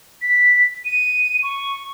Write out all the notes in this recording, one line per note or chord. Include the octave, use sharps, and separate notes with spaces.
B6
D#7
C#6